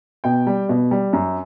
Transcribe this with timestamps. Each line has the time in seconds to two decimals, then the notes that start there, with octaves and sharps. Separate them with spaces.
0.24 B2 G5
0.47 G3
0.69 B2
0.91 G3
1.13 F#2